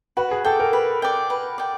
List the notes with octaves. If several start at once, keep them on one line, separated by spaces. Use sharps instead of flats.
F#4 B4
G#4
A4 D5 G5
A#4
B4
D5 G5
B4
D5 G5